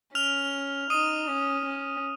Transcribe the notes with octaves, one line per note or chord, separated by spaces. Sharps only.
C#4 F6 F7
D#4 D#6 D#7
C#4
C#4